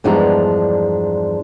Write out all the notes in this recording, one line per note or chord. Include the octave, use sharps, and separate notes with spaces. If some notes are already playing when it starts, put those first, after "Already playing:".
E2 G2 F3 G#3 D4 A#5